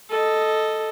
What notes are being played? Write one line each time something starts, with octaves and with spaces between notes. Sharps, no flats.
A4 D#5